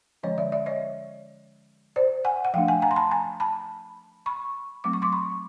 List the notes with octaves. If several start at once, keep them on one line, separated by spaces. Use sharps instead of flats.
D3 F3 G#3 C#4 C#5 D#5
D5 E5
D5 E5
C#5 D#5
C5 D5
F#5 G#5
F#5
F3 A3 D4 F5 G5
F#5 G#5
G#5 A#5
C6
A5 B5
G#5 A#5
A5 B5
B5 C#6
F#3 A3 C4 D6
C#6
C6 D6
B5 C#6